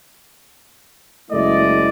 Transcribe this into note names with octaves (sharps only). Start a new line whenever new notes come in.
F#1 G#3 A3 E4 D5 D#5